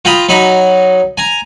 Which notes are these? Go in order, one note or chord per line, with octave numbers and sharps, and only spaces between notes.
F4 G5 A#5 B5 D#6
F#3 D#4 B5
G#5 A#5